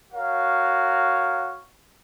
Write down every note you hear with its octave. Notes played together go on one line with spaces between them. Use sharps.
F#4 A#4 C#5 F5